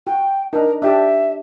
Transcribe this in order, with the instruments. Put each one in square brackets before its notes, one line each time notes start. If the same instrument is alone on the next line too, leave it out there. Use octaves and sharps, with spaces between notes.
[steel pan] F#4 [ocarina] G5
[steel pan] D4 D#4 [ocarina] A#4
[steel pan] D4 G4 D5 [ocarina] E5